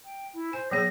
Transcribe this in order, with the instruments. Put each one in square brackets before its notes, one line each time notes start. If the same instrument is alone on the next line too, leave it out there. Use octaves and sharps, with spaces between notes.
[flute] G5
E4
[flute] C5 [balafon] G#5
[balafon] F#3 B3 G#4 [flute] A#6